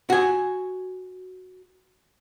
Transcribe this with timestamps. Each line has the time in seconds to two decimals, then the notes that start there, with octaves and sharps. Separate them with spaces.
0.10 F#4 G#5